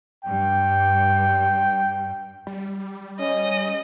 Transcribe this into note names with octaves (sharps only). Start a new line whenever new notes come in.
G2 G5
G3
C#4 D#5